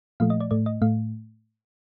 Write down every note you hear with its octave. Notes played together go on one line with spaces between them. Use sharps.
A#2 F3 A3 F5
D#5
D5
A2 A3 D5
D#5
A2 A3 F5